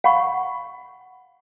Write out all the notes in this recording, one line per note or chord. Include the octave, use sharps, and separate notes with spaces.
F5 F#5 B5 C#6